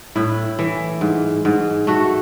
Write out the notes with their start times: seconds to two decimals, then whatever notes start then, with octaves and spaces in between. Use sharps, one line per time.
0.16 A2 E4
0.59 E3
1.01 G#2
1.45 G#2
1.87 A3 F#4